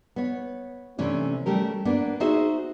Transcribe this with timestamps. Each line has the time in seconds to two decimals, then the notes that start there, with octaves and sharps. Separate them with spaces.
0.16 B3 C#5
0.98 C3 E3 A3 C#4 D4
1.46 G3 A3 C#4 G4 A#4
1.85 A#3 B3 D4
2.20 D#4 F#4 G#4 C5 D#5 E5